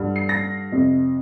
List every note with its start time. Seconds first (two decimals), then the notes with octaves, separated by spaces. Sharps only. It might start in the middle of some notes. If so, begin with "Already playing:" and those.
Already playing: G2 D3
0.16 C7
0.29 A#6
0.72 F2 C3